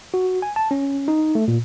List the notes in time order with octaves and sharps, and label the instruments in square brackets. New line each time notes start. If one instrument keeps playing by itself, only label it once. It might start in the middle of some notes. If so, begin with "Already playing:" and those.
[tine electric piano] F#4
G#5
A5
C#4
D#4
A3
A#2